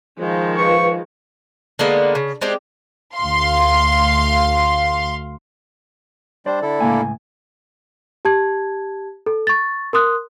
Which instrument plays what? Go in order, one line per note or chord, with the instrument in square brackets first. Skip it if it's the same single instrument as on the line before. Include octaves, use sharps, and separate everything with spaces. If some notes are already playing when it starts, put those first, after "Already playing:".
[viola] D#3 G#3 [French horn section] F3
[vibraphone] F4 B4 F5 [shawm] C#6
[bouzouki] D3 G#3 A#3 B3
C#3
G#3 C4 D4 G4
[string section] D2 F5 C6
[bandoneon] G3 D4 C5 [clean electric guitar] D5
[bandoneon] D3 E4 A4
[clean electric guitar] C#2 A2 G#5 [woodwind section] A#3
[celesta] G4 A5 G#6
A4
C#6 A6
A#4 C6 D#6 F#6